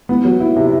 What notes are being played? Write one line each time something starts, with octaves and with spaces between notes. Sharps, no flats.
B3
F#3
E4
C3